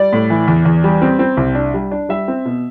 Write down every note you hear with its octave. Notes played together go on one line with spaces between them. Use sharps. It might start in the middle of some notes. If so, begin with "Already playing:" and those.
Already playing: G3 D5
A2
E3
E2
E2
G3
C4
C4
C2
D4
G3
D4
G3 E5
C4
B2